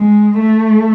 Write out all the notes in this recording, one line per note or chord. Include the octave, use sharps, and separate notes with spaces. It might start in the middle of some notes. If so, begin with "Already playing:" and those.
Already playing: G#3
A3